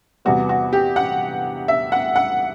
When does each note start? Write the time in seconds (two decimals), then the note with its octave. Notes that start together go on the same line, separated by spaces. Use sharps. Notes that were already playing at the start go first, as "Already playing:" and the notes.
0.25 E2 C3 G3 B3 F#4
0.49 F#4
0.73 G4
0.96 F#5
1.68 E5
1.92 F#5
2.16 F#5